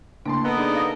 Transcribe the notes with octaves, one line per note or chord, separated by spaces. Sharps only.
A2 C#3 A#3 D4 A5 C6
B3 A4 A#4 D#5 F#5
D4 D#4 G#4 D5
F5 D#6 A#6